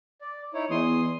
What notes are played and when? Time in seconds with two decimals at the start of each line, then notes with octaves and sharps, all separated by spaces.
0.21 D5
0.54 D#4 E4 C#5
0.71 E2 C6 D#6